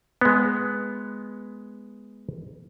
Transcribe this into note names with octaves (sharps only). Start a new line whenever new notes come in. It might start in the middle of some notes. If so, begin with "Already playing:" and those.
G#3 B3